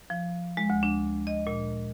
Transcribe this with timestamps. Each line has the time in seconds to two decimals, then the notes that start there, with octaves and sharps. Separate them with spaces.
0.10 F3
0.57 G#3
0.70 D2
0.83 D4
1.27 D#5
1.47 A#2